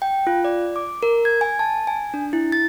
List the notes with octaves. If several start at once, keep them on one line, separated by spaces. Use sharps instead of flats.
G5
F4
D5
D6
A#4
G#6
G#5
A5
G#5
D4
E4
A6